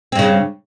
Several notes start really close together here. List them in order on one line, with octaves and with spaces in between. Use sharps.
C4 G2 C#3